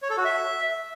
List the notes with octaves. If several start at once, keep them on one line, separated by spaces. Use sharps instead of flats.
C#5
A4
F#4
E5